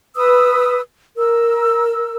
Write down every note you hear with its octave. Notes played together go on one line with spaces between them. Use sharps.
B4 D#6 E6
A#4 E6